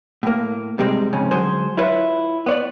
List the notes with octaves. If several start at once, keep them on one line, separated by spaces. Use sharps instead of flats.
A2 A#3
G#2 C3 G3 G#3
F2 G#2 C#3 C#4
D3 F#3 G#3 G#4 C5
E4 F4 B4 C#5 E5
B3 C#5 D5